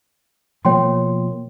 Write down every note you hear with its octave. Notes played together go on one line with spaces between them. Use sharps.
B2 F3 A#3 C#5 G5 C6